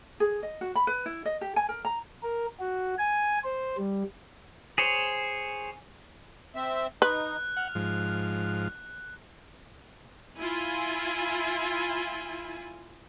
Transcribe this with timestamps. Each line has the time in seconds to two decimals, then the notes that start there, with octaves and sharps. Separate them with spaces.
0.20 G#4
0.43 D#5
0.61 F#4
0.75 B5
0.87 B4
1.06 E4
1.25 D#5
1.41 G4
1.56 G#5
1.69 A#4
1.85 A#5
2.23 A#4
2.60 F#4
2.98 G#5
3.44 C5
3.78 G3
4.78 G#4 C5 C#5
6.55 C4 E5
7.02 D#4 B4 F#6
7.57 F#5 F6
7.75 G#2 F3
10.39 E4 F4 G#5